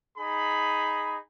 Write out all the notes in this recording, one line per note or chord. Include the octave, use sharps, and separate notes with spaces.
D#4 G#4 B5